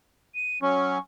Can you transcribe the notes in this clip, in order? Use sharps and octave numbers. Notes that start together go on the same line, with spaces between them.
D#7
F#3 C#4 C#6